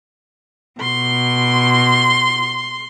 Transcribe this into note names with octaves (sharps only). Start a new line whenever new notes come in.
B2 C6